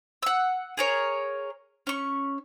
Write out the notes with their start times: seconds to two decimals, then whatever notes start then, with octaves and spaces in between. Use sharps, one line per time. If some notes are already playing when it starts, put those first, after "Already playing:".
0.23 F#5 E6
0.77 G#4 A#4 C#5
1.87 C#4 C#6